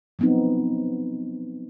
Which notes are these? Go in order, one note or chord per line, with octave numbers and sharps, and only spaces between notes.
F3 F#3 B3 C4 D#4